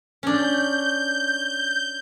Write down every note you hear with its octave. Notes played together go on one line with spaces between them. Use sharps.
C#4 D4 G6